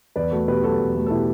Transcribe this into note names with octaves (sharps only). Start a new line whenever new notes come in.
E2 B4 D5
A3 F#4 A4
B2 G4 B4
F#3 F#4 A4
E2
A3
A4
B2 E4 G4